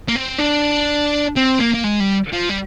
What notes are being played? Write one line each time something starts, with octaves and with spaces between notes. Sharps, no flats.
A#3
C4
D4
C4
A#3
A#3
G#3
G3
F3
G3